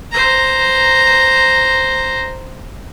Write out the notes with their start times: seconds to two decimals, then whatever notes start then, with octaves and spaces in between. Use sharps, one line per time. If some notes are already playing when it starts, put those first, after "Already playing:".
0.12 C5 A#5